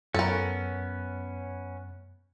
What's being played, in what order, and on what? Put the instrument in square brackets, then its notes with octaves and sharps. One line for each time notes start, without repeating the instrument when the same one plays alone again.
[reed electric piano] F#2 [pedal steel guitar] B3 C#4 [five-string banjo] A4 A#4